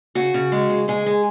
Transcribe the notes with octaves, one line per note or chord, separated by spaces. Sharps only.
C#3 F#4
C#3
G#3
C#3
G#3 G#4
G#3